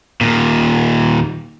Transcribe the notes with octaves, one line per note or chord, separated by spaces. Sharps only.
D#2 A#2